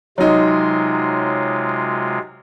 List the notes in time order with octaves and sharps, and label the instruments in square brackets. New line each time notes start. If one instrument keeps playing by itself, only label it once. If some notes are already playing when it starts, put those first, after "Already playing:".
[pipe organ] C3 G#3 F4 [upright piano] F#3 D#4